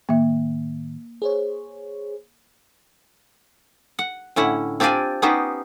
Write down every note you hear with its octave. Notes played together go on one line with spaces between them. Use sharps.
A2 D#3 A#3 E5
G#4 C5 C#5
F#5
A2 D3 C#4 E4 F#5
C4 D4 F4 G4 D5 G#5
B3 C#4 D#4 G4 B4 C5